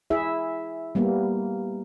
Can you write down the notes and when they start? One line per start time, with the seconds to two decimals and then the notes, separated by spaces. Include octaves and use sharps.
0.10 E4 G#4 E5
0.95 G3 A#3 B3